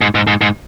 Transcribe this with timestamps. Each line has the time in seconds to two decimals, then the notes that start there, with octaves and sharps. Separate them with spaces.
0.01 G#2
0.15 G#2
0.27 G#2
0.41 G#2